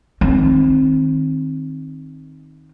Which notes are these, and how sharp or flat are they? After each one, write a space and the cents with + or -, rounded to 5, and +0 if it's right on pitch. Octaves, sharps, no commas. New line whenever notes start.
D#3 +0 C4 +15